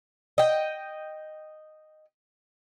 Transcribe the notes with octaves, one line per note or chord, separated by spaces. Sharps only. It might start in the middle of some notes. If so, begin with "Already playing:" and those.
D#5 G5